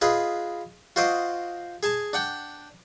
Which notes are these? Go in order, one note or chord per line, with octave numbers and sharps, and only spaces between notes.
F4 G#4 B4 D#5
F4 F#4 C5 D#5 D6 D#6
G#4 G#5 A5
D4 F#5 G5